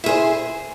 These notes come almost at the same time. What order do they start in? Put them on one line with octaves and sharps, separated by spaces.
E4 G#4 C5